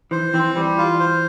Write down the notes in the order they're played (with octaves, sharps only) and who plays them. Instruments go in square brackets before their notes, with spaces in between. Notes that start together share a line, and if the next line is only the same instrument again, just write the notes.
[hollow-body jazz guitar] E3 [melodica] C5
[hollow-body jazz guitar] E3 [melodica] C4
[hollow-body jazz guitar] E3 [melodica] G3
[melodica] F4
C5